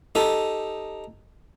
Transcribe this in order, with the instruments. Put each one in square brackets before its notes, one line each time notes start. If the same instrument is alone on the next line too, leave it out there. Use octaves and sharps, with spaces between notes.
[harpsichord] D#4 G4 A4